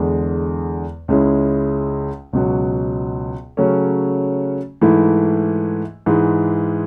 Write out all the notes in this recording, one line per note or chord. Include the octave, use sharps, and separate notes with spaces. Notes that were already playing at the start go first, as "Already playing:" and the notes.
Already playing: E2 D3 G#3
C#2 C#3 G#3 C#4 E4
C#2 B2 F#3
C#3 F#3 A3 C#4
G#2 E3 A3 E4
G#2 E3 G#3